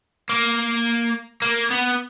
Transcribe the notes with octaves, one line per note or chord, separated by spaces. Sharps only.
A#3
A#3
B3